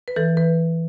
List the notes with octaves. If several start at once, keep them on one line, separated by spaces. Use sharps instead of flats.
B4
E3 A4
E3 B4